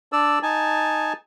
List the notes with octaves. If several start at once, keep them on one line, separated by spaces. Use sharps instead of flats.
D4 D5 E6
D#4 G#5 A5